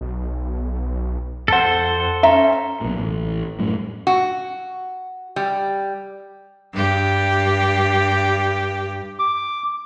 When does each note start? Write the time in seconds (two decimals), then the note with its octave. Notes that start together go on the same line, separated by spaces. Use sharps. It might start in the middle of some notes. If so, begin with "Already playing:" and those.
0.01 B1
1.48 F2 A4 C5 F#5 A5
2.23 C#4 E5 A#5
2.81 B1 A#2
3.00 A1
3.59 F#2 A2 G3
4.07 F#4
5.36 G3
6.74 G2 G4
9.19 D6